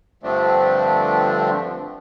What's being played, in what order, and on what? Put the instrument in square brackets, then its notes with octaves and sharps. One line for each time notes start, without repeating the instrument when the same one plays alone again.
[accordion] G2 D3 F3 A3 C4 D4